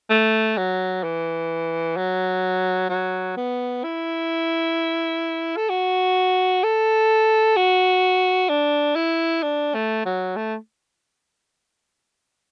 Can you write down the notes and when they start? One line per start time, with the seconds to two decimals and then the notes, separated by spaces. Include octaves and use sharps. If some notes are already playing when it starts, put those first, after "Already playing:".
0.10 A3
0.57 F#3
1.04 E3
1.97 F#3
2.89 F#3
3.37 B3
3.84 E4
5.57 A4
5.69 F#4
6.63 A4
7.57 F#4
8.49 D4
8.96 E4
9.43 D4
9.74 A3
10.05 F#3
10.36 A3